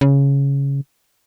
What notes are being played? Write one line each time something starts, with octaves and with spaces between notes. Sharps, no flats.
C#3